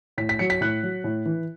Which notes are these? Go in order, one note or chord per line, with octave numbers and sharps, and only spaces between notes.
A2 B6
B6
F#3 C#7
B6
A2 F#6
F#3
A2
E3